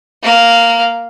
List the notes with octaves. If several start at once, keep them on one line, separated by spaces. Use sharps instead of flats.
A#3 F5